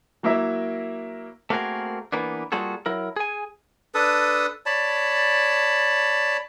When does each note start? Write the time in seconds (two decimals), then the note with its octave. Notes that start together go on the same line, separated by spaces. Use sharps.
0.23 F#3 A#3 E4 A#4 E5
1.50 A3 A#3 C4 F#4 G#4 A#4
2.12 E3 A#3 B3 D4
2.52 G3 A#3 F4 F#4 G#4 A4
2.86 F#3 E4 A#4
3.16 G#4 G#5
3.95 D4 A4 B4 D#6
4.66 C#5 D5 A5 B5